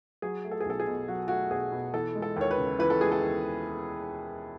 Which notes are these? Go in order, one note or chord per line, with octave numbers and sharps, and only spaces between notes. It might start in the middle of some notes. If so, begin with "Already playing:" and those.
F#3 G#4
A3
A4
G#4
B1 A4
G#4
B2
F#3 F#4
A3 F#4
B1 G#4
B2
E3 A4
G#3
A4
D#2 C#5
B4
C#3
E3 B4
A4
G#3 G#4
A4
D#2